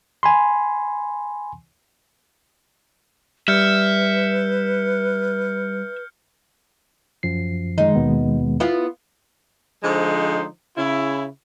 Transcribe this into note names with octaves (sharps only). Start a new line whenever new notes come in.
G#5 B5 C6
G3 B4 E5 F6 G6 C#7
F#2 F3 C7
D#3 G#3 D#4
D#2 B2 B3
B3 E4 F4 B4
D3 F3 G#3 D#4 C5
C#3 E4